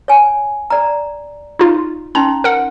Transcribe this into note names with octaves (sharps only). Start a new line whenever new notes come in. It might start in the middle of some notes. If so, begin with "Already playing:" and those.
C#5 G#5
D5 A#5
D#4 F4
C#4 D#4 A#5 C6
A#4 F#5